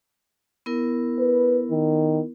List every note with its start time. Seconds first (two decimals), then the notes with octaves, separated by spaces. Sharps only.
0.66 B3 E4 A#4
1.19 B4
1.71 D#3